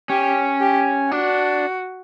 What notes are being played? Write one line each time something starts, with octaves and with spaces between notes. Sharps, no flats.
C#4 G4
G4
D4 F#4